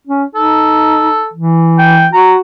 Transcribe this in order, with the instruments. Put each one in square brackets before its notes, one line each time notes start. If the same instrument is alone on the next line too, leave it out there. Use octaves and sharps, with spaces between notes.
[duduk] C#4
[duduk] D#4 [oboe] A4
[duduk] E3
[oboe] G5
[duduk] F#4 [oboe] A#5